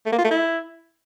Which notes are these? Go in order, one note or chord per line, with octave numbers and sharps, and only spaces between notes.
A3
A#3
F4
A3
E4